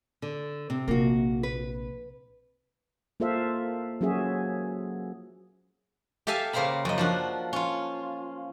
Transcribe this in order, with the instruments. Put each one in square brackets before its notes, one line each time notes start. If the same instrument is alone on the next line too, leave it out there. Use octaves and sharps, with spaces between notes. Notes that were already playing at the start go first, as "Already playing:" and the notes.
[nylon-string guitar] D3
C3
[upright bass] A#1 C3 [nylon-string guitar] A#3 F#4
[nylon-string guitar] B4
[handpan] A#3 F4 A4 C5 E5 F5
F#3 A#3 C#4 F#4 G#4 E5
[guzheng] G4 A4 E5 F5 G#5 A5
C#3 A#3 C5 F5 A#5 B5
F#2 D#5
F3 D4 F#4
C#4 F4